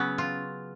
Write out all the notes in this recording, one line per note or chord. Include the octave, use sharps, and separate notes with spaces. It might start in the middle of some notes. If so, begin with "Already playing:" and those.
Already playing: C#3 F#3 B3 C#4
F4